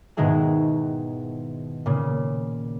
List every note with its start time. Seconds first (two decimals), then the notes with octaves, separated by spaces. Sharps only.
0.17 G#2 B2 D#3 G#3 E4 G#4
1.86 A#2 C#3